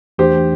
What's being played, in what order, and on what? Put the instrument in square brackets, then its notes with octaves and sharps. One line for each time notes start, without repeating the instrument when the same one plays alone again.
[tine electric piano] E2 E3 A3 D4 [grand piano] G4 C5